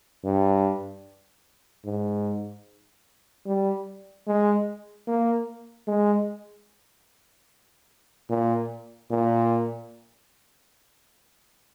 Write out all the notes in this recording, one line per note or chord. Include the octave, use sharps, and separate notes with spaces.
G2
G#2
G3
G#3
A#3
G#3
A#2
A#2